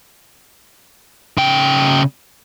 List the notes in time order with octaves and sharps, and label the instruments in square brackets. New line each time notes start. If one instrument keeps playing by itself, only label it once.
[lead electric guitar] C#3 G5